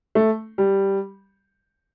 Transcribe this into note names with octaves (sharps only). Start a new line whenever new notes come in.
A3
G3